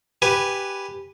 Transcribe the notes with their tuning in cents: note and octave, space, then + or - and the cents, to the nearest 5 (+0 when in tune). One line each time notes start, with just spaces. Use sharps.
G4 +0 B4 +0 G#5 +0